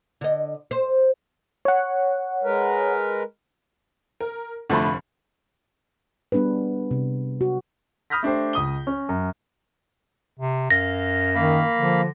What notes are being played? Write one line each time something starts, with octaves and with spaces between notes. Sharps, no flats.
D3 D#5
C5
C#5 F#5
G#3 A#4 B4
A#4
F1 D3 F3 A3 B5
G3 B3 D4 G#4 B4
C3
F#4
B5 D#6 F6 G6 A#6 B6
A3 D4 G4 C5
C#2 D#6 G7
C#4
F#2
C3
F#2 F5 A#6
D#3 A#3 F5 B5
D3 F3